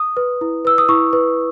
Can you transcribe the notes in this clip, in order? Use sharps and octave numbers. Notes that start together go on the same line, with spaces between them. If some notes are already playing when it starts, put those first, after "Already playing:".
Already playing: D#6
B4
E4
B4 E6
D#6
E4 C#6
B4